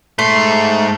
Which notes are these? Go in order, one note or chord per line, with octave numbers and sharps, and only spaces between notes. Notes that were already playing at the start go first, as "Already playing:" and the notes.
G#2 A3 C6